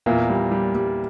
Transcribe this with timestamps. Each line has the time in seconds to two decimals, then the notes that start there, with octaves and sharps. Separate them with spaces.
0.06 E2 A#2 A#3
0.29 G3
0.51 G3
0.75 G3